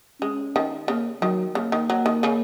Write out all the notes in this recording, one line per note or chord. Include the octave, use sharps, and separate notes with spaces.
G#3 C#4
D#3
C#3 A#3
D#3 F#3
C#3 A#3
D#3
F#3
D#3
C#3